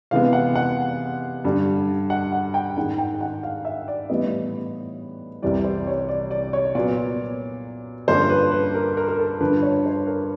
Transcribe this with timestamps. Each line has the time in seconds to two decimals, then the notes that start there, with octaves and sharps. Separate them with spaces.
0.11 C3 E3 G#3 B3 F5
0.33 F#5
0.55 F#5
1.44 G2 D3 G3
2.10 F#5
2.32 F#5
2.54 G5
2.77 G#2 D#3 G#3 F#5
2.98 G5
3.21 F#5
3.43 F5
3.65 E5
3.88 D5
4.09 A2 E3 G3 B3 D#5
5.42 C2 C3 E3 G3 D5
5.64 C5
5.87 C#5
6.09 D5
6.31 D5
6.53 C#5
6.75 A#2 F#3 B3 D5
8.08 G2 D3 F3 A#3 C#4 C5
8.30 B4
8.52 B4
8.74 A#4
8.97 A#4
9.08 A#4
9.19 A4
9.40 G2 D3 F3 B4
9.62 C#5
9.86 C5
10.07 A#4